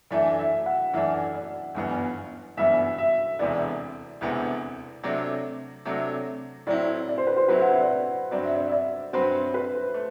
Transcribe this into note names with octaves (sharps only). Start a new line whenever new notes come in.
F#2 E3 A3 D4 E5
E5
F#5
F#2 E3 A3 D4 E5
D5
G1 F#2 E3 G3 B3
G1 F#2 E3 G3 B3 E5
E5
E1 D2 C3 E3 B3 D5
E1 D2 C3 E3 B3
C3 F#3 A3 D4
C3 F#3 A3 D4
A2 F#3 C4 E4 D5
D5
C5
B4
C5
A2 F#3 C4 E4 B4
F#5
E5
D5
C5
G2 F#3 C4 F#4 B4 D5
E5
D5
E5
D5
G2 F#3 C4 F#4 B4 C5
B4
A3